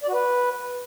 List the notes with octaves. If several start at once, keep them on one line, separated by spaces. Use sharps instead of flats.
D5
F#4
B4